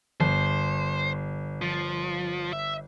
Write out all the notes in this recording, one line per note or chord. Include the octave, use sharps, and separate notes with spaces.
G1 C5
F3
E5